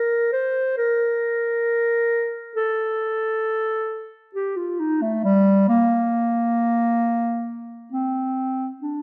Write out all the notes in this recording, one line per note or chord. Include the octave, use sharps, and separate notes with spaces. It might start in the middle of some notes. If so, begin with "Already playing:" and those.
Already playing: A#4
C5
A#4
A4
G4
F4
D#4
A3
G3
A#3
C4
D4